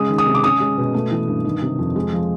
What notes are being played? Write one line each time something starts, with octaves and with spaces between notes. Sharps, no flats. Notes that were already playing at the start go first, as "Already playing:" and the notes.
Already playing: C#3 G#3 D#6
D#3
D#6
C3
D6
C#4 D#6
G#3
B2
A3
E3
G2
D#3
C3
F2
G#3
F3